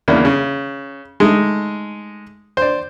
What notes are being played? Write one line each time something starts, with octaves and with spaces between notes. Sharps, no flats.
E2 C#3 A#3 D4
C#3
G#3 A3 D#4
C5 D5